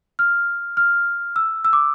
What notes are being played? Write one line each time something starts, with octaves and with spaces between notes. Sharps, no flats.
F6
F6
E6
E6
D6